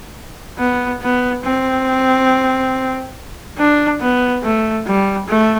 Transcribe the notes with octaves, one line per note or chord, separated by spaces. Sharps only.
B3
B3
C4
D4
B3
A3
G3
A3